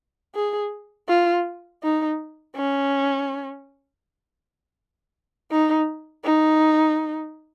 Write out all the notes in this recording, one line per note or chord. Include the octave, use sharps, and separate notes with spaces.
G#4
F4
D#4
C#4
D#4
D#4